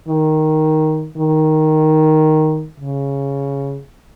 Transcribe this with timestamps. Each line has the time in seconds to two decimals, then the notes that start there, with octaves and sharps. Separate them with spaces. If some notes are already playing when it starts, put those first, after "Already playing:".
0.08 D#3
1.17 D#3
2.80 C#3